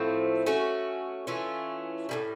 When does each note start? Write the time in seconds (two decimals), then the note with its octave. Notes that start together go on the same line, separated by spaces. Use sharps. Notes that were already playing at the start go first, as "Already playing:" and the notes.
Already playing: A2 F3 A3 C4
0.46 A3 C#4 F#4
1.27 E3 A3 C#4 F4
2.09 A2 E3 G3